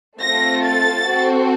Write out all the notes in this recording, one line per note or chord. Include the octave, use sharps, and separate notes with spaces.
A3 C4 F4 A4 A#6
A6
C4 F#4 A4